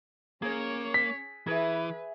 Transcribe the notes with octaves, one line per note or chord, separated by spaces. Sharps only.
A#3 C#4 G#4 C#5
B6
E3 G#4 B4 E5